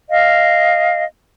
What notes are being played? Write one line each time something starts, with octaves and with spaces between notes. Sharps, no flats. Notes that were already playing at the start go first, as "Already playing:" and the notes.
D#5 F5